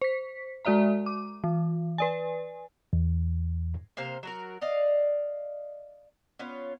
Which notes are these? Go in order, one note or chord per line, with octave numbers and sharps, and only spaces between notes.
C5 B6
G#3 F#4 D5 E5 A#5
D6
E3
B4 D5 G#5
E2
C3 A#3 C5 F5
F#3 F#4 A#4
D5 D#5 F5
B3 C#4 F4 C#5